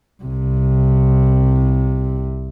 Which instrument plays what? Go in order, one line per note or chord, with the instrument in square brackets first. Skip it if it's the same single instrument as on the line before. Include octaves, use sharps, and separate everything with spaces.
[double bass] C2 C3